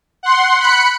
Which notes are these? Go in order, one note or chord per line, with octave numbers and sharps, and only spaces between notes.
F#5 C6
B5 F#6 C#7